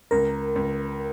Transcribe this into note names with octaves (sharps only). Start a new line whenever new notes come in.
C#2 A#4
C#2